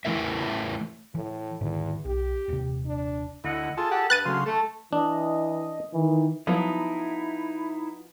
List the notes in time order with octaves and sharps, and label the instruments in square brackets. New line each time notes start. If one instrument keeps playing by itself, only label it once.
[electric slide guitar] E3 A3 E4 A#4 E5
[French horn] A2 [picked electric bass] E3
[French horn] E2 [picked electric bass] G#2 D3 D#3
[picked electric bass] B1 [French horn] G4
[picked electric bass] D#1 C3
[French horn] D4
[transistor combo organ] D2 E4 [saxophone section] D#5 F#5
[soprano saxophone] F4 [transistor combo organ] G#4 A4 A5
[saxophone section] G4 [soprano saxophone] F#5
[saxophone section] G2 [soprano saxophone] B4 [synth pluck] F#6 A6 D#7
[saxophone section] D2 [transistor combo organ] C#3 F#3 F5 [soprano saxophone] C6
[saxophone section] A3 [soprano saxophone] A4 [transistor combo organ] A5
[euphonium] E3 [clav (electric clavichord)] D4 [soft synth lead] D#5
[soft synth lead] D#3 [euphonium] E3
[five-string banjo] F3 F#3 B3 [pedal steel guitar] D#4 E4